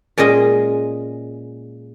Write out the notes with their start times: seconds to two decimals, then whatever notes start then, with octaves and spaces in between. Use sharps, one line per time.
0.18 A#2 G#3 C#4 G#4 D#5